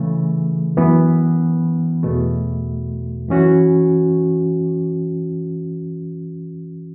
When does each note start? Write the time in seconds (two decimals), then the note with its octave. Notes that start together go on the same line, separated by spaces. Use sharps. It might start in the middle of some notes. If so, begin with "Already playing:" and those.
Already playing: C#3 E3 A3
0.77 F#2 E3 B3
2.03 E2 B2 A3
3.28 F#2 E3 C#4 F#4